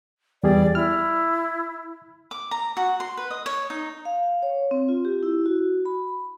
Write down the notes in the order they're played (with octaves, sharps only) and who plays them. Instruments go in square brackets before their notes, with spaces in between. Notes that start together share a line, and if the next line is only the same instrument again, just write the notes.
[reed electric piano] E2 G3 G#4 [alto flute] D5
[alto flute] E4 [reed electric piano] F6
[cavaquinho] D6
A#5
F#4
C6
B4
D#5
C#5
D#4
[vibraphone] F5
C#5
C4
F4
G4
E4
F#4
B5